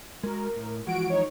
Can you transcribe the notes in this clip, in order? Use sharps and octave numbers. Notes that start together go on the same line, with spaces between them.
G#3 F#4 A#4
A2
E3 F3 G#3 F#4 D7
D#4 C#5